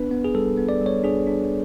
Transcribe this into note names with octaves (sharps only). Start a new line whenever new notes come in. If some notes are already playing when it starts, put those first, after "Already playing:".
Already playing: B3 D4 B4
B3
G#4
G3 A4
B3
D5
G3
C#5
D4 G#4
D4